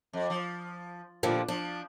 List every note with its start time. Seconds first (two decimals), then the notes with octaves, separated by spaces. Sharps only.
0.13 F2
0.30 F3
1.23 A#2 D3 F3 G3
1.48 F3 D4